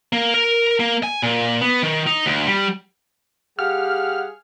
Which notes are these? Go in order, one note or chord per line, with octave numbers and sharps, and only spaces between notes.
A#3
A#4
A#3
G#5
A#2
B3
D#3
D#4
D2
G3
G3 G4 G#4 F5 F#5 F6